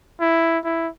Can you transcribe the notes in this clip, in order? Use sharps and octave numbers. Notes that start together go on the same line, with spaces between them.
E4
E4